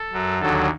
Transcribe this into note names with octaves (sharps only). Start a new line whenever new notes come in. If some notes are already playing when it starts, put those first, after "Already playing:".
Already playing: A4
F#2 F#3
D#2 D3 F#3 A4